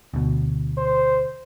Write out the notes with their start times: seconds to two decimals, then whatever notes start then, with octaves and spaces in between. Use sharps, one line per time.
0.14 D2 B2
0.78 C5